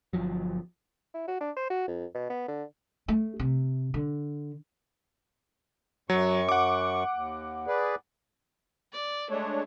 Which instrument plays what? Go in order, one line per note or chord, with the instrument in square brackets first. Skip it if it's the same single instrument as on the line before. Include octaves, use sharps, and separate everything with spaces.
[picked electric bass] G1 C2 F3 F#3
[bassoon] E4
F#4
D4
C5
F#4
F2
B2
B3
D3
[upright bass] A3
C3
D3
[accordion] F#2 C#6 [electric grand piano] F#3
[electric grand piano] F#5 D6
[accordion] D#2
G#4 B4 D5
[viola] D5
[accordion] G#3 D4 C#5 [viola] A3